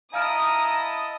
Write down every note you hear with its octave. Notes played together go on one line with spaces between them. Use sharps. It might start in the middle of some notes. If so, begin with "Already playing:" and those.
E4 D#5 F5 A5 A#5 D#6 F6 D7